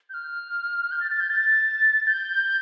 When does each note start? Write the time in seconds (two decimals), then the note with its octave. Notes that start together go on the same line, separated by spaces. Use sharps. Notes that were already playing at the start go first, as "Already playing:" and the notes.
0.09 G6
0.14 F6
0.91 G6
1.00 A6
1.11 A6
1.20 G6
1.30 A6
2.07 G6